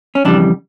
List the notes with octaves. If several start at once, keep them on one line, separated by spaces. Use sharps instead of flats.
C#4
F2 C#3 E3 G3 D4